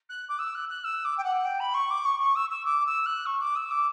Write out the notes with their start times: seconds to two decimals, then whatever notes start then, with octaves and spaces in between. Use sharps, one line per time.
0.09 F#6
0.29 D6
0.39 E6
0.55 F#6
0.69 F#6
0.84 E6
1.04 D6
1.17 G5
1.24 F#5
1.44 G5
1.60 B5
1.74 C#6
1.90 D6
2.05 C#6
2.20 C#6
2.35 E6
2.50 E6
2.65 D6
2.86 E6
3.06 F#6
3.26 C#6
3.40 D6
3.55 E6
3.71 D6